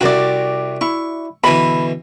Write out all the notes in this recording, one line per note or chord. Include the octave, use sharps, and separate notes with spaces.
C2 C3 F#4 D5
E4 C#6
B2 D3 E3 B5